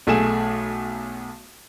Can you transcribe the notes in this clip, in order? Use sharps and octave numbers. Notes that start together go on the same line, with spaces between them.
B1 A3 G#4 E7